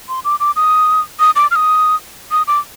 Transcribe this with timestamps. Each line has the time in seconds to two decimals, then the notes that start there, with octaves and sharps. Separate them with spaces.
0.09 C6
0.25 D6
0.40 D6
0.56 D#6
1.20 D#6
1.36 D6
1.51 F6
1.56 D#6
2.31 D#6
2.47 D6